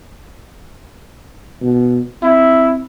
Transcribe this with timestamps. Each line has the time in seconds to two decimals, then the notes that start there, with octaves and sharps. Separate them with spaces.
1.61 B2
2.23 C4 E4